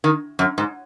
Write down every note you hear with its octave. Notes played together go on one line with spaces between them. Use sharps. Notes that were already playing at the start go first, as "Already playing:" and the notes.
D#3
F#2
G#2